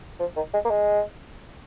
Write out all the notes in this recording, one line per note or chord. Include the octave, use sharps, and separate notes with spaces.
F3
D#3
G#3
A#3
G#3